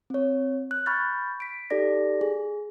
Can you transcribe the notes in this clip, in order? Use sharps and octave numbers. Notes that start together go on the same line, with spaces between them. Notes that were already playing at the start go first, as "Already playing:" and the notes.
C4 C#5
F#6
B5 C#6 F6 G6 A6
B6 D7
D#4 G4 A4 D5 A#6
G#4